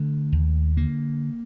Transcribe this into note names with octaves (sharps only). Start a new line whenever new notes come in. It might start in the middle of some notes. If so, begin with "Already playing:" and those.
Already playing: D3 A3
D#2
D3 A#3